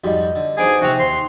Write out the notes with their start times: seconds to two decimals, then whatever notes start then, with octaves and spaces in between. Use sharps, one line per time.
0.04 F2 G#2 G3 F#4 D#5
0.36 D3
0.58 B3 D4 D#4 G#4 C5 G#5 D#6 D7
0.82 A#1 C3 C4 D#4 F#4 G5 F7
0.99 D#2 C6